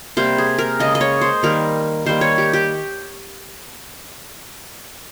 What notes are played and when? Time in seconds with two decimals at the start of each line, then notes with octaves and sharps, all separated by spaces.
0.17 C3 G3 A#3 C5
0.38 G#4
0.58 A#4
0.80 C#3 G#3 D#5
0.95 D#5
1.01 C#5
1.21 C5
1.43 D#3 G3 A#3 A#4
2.06 D#3 G3 A#3 C5
2.21 C#5
2.38 G4
2.53 G4